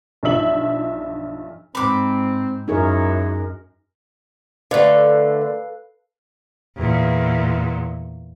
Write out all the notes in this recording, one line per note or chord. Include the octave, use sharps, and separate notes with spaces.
B1 G2 F3 E5 F#7
G#2 C4 B5 D6
F#2 D#4 E4 G#4 A#4 C#5
D3 A3 A4 B4 D5 F5
E2 A#2